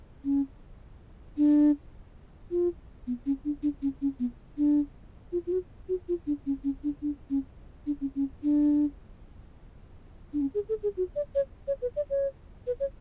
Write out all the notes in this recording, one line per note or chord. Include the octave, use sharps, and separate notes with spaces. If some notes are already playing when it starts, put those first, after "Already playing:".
C#4
D4
F4
B3
C#4
D4
D4
C#4
C#4
B3
D4
F4
F4
F#4
F#4
F4
D4
C#4
C#4
D4
D4
C#4
D4
C#4
C#4
D4
D4
C#4
G#4
A4
G#4
F#4
D5
C#5
C#5
B4
D5
C#5
B4
C#5